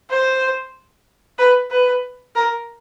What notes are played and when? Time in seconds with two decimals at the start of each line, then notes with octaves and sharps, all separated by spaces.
0.10 C5
1.38 B4
1.71 B4
2.35 A#4